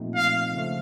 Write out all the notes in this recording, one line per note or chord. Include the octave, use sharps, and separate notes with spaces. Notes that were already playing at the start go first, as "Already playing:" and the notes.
Already playing: A#2 F3 A3 C4 D#4
F5
C#3 F3 A3